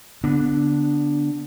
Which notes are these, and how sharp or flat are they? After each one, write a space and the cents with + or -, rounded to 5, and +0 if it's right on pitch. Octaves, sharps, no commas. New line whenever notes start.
D3 -20 B3 +0 D4 +0